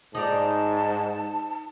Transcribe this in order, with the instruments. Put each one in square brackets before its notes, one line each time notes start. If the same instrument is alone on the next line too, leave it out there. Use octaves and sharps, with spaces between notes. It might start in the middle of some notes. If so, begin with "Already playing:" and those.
[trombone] G#2 [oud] D#4 D5 [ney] A5